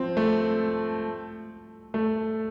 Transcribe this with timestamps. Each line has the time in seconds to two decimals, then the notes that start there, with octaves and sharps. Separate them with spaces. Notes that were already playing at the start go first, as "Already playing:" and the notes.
Already playing: F3 C4
0.17 A3
1.94 A3